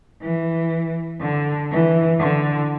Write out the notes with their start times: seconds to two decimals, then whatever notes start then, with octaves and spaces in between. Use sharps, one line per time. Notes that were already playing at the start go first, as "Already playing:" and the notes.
0.22 E3
1.21 D3
1.71 E3
2.20 D3